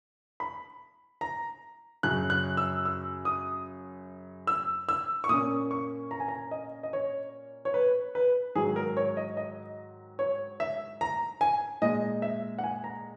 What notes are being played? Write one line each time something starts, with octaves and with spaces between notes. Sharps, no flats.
B5
A#5
F#2 C#3 F#3 F#6
F#6
E6
E6
D#6
E6
E6
C#6
A#2 A#3 C#4 D#6
C#6
A#5
G#5
A#5
D#5
D#5
C#5
C#5
B4
B4
G#2 D#3 F#3 G#4
A#4
C#5
D#5
D#5
C#5
E5
A#5
G#5
A#2 G#3 D#4 D#5
E5
F#5
G#5
A#5